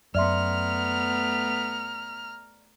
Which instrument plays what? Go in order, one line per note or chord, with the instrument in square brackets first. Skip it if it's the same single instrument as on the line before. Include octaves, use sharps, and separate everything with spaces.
[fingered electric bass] F#2 [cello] A3 B3 [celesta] D5 E5 C6 [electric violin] A#5 F6